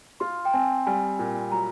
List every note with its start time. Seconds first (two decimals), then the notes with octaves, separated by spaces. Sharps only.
0.20 F4 C6
0.45 G5
0.53 C4 G#5
0.87 G3 G#5
1.19 A#2
1.52 F#3 A#5